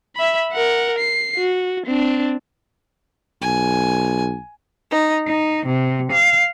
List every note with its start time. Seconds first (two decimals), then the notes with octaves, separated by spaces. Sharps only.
0.16 E5 B5
0.52 A#4 F#5
0.98 C7
1.38 F#4
1.86 C4 D4
3.42 B1 G#5
4.91 D#4
5.27 D#4
5.65 C3
6.12 F5